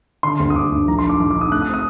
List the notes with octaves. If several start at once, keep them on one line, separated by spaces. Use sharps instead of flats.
D3 C6
D2
D#6
D2 D6
D2
A#1 A#5
C6
D#4
D6
A#1 D6
D6
D#4
D#6
A3 F#6
D#6
C4
D#6